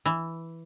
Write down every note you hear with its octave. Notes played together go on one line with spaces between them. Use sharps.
E3